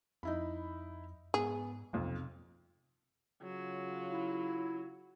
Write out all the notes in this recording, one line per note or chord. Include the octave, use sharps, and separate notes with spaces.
F2 D#4 E4 B5
G#2 B3 G#4
B1 F2 C3
C#3 F#3 F4
E4